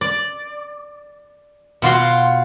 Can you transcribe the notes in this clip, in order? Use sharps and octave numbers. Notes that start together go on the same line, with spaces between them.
D5
B2 F4 F#4 C6